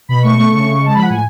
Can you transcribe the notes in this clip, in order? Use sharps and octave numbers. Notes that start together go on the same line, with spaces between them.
B2 B5
A3 C#6
A3 C#6
C#3 C#6
C#3
G#3
A5
F3 B5
F#5
A2 G#5